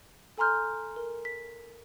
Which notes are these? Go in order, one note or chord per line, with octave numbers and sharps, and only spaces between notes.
A4 G#5 A#5 C6 F6 G6
A#4
B6